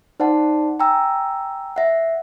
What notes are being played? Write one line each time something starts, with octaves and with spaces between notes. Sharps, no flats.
D#4 C5 D5 F#5 A5
G5 G#5 A#5 E6
E5 F#5